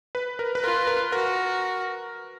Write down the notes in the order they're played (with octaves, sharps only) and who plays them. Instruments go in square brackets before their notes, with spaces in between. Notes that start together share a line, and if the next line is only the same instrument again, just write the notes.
[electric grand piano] B4
A#4
B4
[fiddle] F4 [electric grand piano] A#4
[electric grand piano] A#4
[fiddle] F#4 [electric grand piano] A#4